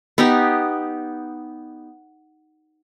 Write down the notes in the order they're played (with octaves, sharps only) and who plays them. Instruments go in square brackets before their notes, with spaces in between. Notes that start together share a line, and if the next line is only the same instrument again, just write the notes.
[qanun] B3 D#4 G4